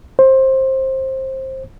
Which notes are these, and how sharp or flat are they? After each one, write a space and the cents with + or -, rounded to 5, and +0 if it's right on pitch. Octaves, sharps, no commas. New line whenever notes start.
C5 +20